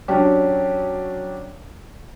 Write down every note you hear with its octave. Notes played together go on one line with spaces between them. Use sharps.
F#3 C#4 D4 G4